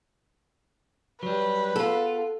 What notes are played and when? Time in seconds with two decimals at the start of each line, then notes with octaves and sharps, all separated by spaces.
1.23 F#3 G3 B4
1.76 B3 F4 A4